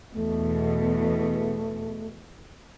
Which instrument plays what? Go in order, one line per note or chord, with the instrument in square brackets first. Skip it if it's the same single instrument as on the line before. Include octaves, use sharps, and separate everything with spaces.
[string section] E2 B2 [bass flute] A3